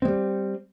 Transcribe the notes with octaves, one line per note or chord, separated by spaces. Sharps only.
G3 G#3 C4